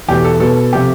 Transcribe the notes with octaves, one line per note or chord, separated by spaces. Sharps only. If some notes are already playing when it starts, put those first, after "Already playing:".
E2 B2 A3 G4
A4
B2 B3 A4
C3 F3 A3 G4